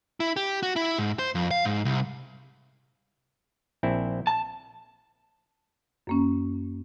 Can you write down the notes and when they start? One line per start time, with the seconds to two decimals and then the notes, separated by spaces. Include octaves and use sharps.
0.20 E4
0.36 G4
0.63 F#4
0.76 E4
0.98 G#2
1.19 C5
1.35 F2
1.51 F5
1.65 G#2
1.85 C2
3.83 A#1 C4 E4
4.27 A5
6.07 F#2 A#3 C#4